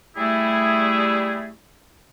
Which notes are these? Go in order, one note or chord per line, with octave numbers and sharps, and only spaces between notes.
G3 A3 E4 G#4